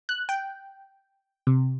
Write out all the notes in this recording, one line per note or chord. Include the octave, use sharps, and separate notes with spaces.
F#6
G5
C3